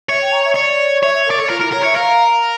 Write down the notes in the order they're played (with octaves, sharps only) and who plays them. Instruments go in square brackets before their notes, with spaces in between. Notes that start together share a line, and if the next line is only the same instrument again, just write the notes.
[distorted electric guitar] C#5 [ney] E5
[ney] G5
A#5
E5
[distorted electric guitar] C#5 [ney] D5
[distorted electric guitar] C#5 [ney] E5
[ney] E5
A#4
[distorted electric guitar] D5
[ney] A4 [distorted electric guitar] C#5
[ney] F4 [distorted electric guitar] A#4
[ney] E4 [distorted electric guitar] A#4
[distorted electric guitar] A#4 [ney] C#5
[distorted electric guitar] C#5 [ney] E5
[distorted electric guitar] A#4 [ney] F5